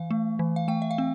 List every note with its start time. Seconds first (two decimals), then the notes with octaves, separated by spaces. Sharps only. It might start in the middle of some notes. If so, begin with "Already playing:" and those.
Already playing: E3 F5
0.11 A3
0.39 E3
0.56 F5
0.68 A3 G5
0.82 E5
0.91 F5
0.98 C4